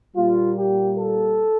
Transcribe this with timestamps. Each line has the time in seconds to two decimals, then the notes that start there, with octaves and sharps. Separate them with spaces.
0.15 A#2 G3 A#3 F4
0.56 G4
0.99 A4